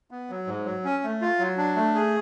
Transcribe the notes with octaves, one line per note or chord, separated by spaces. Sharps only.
B3
F#3
G#2
F#3
C#4
A3
F4
F#3
D4
A3
G#4